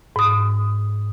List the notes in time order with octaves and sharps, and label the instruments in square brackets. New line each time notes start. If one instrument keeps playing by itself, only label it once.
[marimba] G#2 D#6